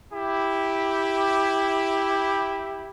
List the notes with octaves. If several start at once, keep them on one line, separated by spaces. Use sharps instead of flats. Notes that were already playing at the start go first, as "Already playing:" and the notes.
E4 G4